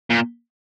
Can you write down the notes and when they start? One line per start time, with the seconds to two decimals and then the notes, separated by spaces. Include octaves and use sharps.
0.10 A#2